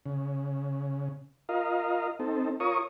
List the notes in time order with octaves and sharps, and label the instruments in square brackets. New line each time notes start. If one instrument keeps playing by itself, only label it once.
[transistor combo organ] C#3
F4 A#4 D#5 F5
C4 D#4 A4
F4 A#4 C#5 C#6 D#6